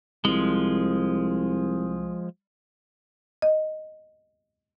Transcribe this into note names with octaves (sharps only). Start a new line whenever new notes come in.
C2 F3 G#3
D#5